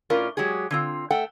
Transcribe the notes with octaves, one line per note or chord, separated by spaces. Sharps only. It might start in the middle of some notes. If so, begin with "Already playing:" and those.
A2 C#4 F4 A#4 D5
F#3 G#3 G4 G#4
D3 C4 F4
A3 F#5 G5